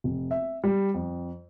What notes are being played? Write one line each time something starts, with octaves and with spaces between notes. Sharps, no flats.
F1
E5
G3
F2